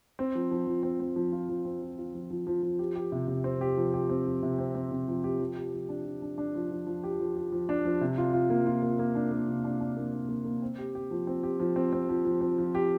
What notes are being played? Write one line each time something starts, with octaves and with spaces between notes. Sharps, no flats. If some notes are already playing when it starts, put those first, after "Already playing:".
C4
F3
F3
F3
C4
C4
F3
F4
F3
C4
F4
F4
F3
F3
F3
F3
G4
G4
C3
C3
C4
G4
F3
G4
C4
F3
C3
C4
C4
C3
F3
G4
F3
G4
F3
D4
F3
D4
D4
F3
F3
F3
G4
F3
G4
F3
D4
F3
C3
F4
F4
A#3
F4
A#3
A#3
D4
A#3
C3
D4
D4
A#3
D4
A#3
A#3
C4
G4
G4
F3
C4
G4
F3
C4
C4
F3
F3
C4
F3
G4